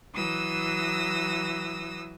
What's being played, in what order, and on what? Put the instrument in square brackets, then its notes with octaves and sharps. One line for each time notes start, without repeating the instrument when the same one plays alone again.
[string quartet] E3 F#3 D#6 E6 A#6